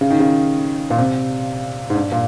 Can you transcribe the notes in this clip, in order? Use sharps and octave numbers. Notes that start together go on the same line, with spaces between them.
C#3
D#3
C#3
A#2
C3
G#2
G2
A#2